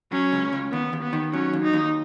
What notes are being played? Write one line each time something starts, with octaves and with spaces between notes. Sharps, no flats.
F#3 C#4
C#2
C#2
D#2 B3
D#2
B3
D#3
F#3 C#4
D#2
D#4
D#2